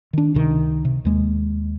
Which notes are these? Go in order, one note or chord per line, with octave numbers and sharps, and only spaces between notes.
D#3 D4
C#2 C3 D#3
C3
D#2 G#3 A#3